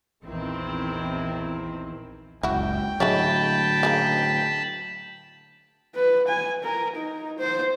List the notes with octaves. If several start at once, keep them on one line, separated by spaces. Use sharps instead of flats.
A#1 E2 D#3 C4 E4
F#1 C#2 E4 F#4 G5
A2 D3 F#3 G#3 E4 C#5 A5 B5
C#3 G3 A#3
B4
G#5
A#4
D#4
C5